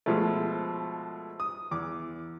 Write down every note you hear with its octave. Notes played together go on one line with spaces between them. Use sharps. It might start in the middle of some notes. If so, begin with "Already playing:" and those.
B2 F3 G#3 A3
D#6
E2 D6